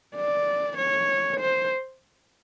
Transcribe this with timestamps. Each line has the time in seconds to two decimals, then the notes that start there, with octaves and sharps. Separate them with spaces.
0.16 D5
0.78 C#5
1.41 C5